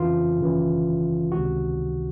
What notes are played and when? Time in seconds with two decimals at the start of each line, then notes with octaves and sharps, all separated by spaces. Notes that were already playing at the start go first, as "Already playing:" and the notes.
Already playing: F2 C#3 E3 F4
0.38 G#1 F#2 C#3 E3
1.32 C#2 C3 D#3 F#4